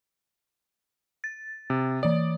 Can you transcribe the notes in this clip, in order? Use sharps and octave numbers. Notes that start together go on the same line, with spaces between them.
A6
C3
E3 D5 D#6